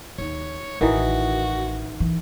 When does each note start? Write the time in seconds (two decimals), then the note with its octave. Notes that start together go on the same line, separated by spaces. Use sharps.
0.18 D#2 C#5
0.81 A1 D#3 E3 D#4 F#4
2.00 E3